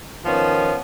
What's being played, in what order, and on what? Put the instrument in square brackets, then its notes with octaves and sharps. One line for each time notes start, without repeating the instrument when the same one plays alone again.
[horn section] D#3 F3 B3 C#4